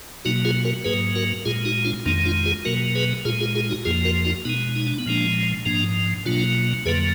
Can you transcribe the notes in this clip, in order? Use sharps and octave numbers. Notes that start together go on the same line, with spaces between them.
B2 F#3 A#3 D#4 F#4
F4 G#4
F#4 A#4
G#2 F#3 A#3 G#4 B4
F#4 A#4
A#2 G#3 F4 G#4
D#4 F#4
D4 F4
F2 D#3 G#3 A#3 D4
D4 F4
F4 G#4
B2 F#3 A#3 F#4 A#4
G#4 B4
A#2 G#3 F4 G#4
F4 G#4
F4 G#4
D#4 F#4
F2 F3 A#3 F4 G#4
F#4 A#4
D#4 F#4
B2 G#3 B3 D#4
D#4
D4
B3
A#2 F3 G#3 A#3 D4
G#2 F3 A#3 D4
B2 F#3 A#3 D4 F4
F2 D3 F#3 A#3 G#4 B4